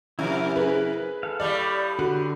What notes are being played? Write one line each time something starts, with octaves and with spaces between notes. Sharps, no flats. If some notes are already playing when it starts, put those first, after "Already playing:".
F2 C3 E4 A#4
G#4 B4
A4 F5
A2 G3 A3 D5
D3 F#4